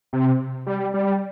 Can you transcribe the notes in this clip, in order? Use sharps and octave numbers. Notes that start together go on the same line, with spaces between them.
C3
G3
G3